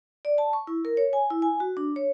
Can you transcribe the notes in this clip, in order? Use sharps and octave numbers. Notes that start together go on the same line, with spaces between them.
D5
A5
C#6
E4
A#4
C#5
G#5
E4
G#5
F#4
D4
C#5